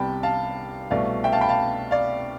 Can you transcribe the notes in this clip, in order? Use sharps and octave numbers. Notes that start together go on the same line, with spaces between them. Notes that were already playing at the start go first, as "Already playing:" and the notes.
Already playing: C2 C3 G3 B3 G5 A5 B5
F5 A5
C2 B2 A3 D5 F5
E5 G5
F5 A5
G5 B5
F5 A5
D5 F5